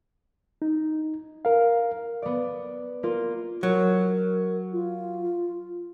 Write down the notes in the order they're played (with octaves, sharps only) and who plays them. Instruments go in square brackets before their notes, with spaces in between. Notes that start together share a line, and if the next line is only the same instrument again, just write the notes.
[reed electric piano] D#4
A#4 F5
[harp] B3 D5
A#3 F4
[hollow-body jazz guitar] F#3 [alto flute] A#4
[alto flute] F4